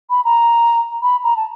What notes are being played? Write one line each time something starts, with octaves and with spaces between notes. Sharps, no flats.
B5
A#5
B5
A#5
A5